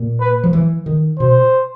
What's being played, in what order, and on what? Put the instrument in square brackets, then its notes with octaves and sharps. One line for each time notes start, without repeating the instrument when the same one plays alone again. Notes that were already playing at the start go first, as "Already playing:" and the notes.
Already playing: [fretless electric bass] A#2
[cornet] B4
[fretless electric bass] F3
E3
D#3
[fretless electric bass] B2 [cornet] C5